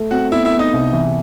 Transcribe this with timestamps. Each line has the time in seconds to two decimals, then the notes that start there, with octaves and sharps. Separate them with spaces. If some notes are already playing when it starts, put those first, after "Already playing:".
Already playing: A3
0.11 C4 F#4 F#5
0.32 B3 E4 E5
0.45 E4 E5
0.52 B3
0.59 D#4 D#5
0.73 C2
0.93 E3